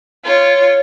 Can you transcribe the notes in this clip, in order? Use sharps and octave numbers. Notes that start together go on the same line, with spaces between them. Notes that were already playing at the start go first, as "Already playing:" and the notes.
F4 C#5